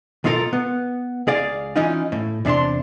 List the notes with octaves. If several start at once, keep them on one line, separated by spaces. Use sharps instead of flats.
B1 D#3 A#3 F4 A4 A#4
B3
C#2 G#4 D5 F5
E3 C#4 D#4 F4
A2
E2 C3 D4 A5 C6